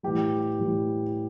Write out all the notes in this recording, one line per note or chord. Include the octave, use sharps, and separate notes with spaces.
A2 E3 G3 G4
A2 E3 G3